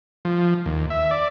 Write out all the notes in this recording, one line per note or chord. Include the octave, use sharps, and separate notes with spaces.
F3
D#2
E5
D5